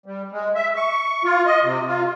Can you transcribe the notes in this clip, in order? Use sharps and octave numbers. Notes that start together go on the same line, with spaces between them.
G3
G#3
E5
C#6
F4
D#5
C3
F4